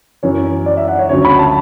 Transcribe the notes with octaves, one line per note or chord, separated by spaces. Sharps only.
F#2 E3 C#5
D5
E5
F#5
C#5
D2 C#3 F#3 C#5
B5
A5